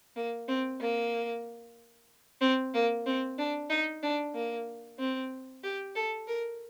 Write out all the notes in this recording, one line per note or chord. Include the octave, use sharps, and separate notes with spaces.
A#3
C4
A#3
C4
A#3
C4
D4
D#4
D4
A#3
C4
G4
A4
A#4